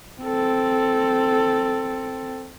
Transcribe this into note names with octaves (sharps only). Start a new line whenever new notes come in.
C4 A4